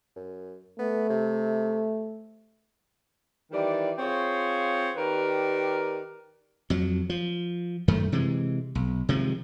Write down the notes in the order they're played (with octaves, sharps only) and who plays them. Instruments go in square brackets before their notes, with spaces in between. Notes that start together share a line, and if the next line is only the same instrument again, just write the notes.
[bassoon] F#2
[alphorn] A3 [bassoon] B3
[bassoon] C3
[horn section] D#3 E3 G3 D5
C4 F4 G#4 C#5
D#3 G4 A#4 B4 D5
[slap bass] F2 F#3
F3
F#2 D#3 A3
C3 E3 G#3
B1
C3 D#3 F3 G#3